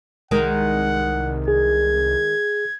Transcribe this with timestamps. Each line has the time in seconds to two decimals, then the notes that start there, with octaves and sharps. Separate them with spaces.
0.31 C2 D#3 G#3 A#4 F#5
1.48 G#4 G#6